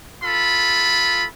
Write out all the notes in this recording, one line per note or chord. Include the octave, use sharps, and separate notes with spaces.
F4 A4 B5